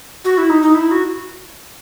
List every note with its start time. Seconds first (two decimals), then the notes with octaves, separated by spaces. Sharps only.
0.25 F#4
0.38 E4
0.50 D#4
0.62 D#4
0.75 E4
0.91 F#4